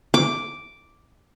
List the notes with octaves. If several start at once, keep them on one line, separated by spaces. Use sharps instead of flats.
D6